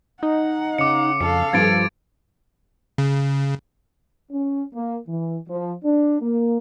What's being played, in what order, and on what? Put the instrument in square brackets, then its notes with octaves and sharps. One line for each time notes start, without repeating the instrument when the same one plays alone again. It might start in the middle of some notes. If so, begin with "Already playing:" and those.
[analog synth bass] D#4 [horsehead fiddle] F#5
[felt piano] C#3 [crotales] D6 C#7
[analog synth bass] F2 [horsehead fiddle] A4 F5 [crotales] C#7
[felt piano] G2 G3 [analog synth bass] F3 [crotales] G#6 A6 D7
[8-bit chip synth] C#3
[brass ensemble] C#4
A#3
E3
F3
D4
A#3